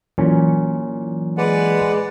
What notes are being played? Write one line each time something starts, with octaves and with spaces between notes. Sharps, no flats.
A#2 E3 F#3 C#4
G#3 B4 D5 F#5